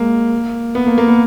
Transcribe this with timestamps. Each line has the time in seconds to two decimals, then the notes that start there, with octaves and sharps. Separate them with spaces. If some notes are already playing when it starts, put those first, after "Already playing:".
Already playing: G#3 A#3
0.75 B3
0.87 A#3
0.98 A#3
1.08 B3